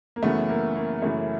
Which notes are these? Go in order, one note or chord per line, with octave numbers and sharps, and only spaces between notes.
A#3
F#2 C#3 E3 A3 B3
A#3
A#3
F#2 C#3 E3 A3